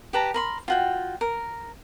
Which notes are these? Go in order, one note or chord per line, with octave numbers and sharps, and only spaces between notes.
G4 B4 A5 A#5
A#4 B5 C6
F4 F#4 G5
A#4